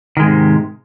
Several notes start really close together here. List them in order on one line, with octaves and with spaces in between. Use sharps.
D#3 G#3 G#2 C3